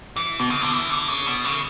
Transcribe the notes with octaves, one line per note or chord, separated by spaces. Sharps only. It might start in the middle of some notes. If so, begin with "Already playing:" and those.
E3
B2
C#3
D3
E3
D3
C#3
B2
C#3